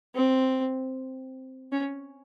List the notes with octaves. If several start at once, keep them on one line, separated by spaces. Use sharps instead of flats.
C4
C#4